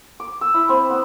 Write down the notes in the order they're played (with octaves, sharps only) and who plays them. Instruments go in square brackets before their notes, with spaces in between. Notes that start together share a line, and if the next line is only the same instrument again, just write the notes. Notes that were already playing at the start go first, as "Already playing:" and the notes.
[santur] D6
E6
E4
C4
B3